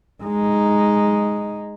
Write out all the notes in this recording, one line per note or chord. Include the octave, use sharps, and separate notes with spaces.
G#3 D#4